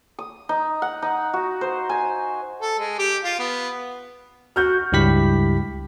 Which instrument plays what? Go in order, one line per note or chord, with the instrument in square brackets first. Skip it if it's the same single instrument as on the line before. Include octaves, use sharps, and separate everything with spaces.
[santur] D#6
D#4
F#5
D#4
F#4
C5
G#5
[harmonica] A4
G#3
G4
F4
B3
[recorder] F#4 [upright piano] F6 G6
[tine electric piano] C#2 G2 E4 G4 B5 B6